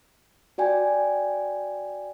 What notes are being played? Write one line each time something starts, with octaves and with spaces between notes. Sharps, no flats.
F#4 D5 G5 G#5